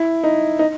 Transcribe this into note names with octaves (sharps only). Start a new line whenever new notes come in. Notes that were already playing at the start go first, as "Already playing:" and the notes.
Already playing: E4
D#4
D#4